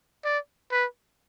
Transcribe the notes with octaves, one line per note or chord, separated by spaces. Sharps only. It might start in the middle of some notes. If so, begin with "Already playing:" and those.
D5
B4